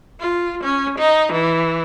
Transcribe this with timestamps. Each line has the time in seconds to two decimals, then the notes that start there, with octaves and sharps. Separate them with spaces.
0.20 F4
0.63 C#4
0.98 D#4
1.32 E3